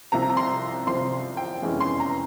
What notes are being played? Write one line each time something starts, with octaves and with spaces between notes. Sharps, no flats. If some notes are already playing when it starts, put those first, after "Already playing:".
C2 C3 F3 C4 A#5
A#5
C6
C2 C3 F3 C4 C6
G5
F1 E2 E3 G#3 C#4
C6
A#5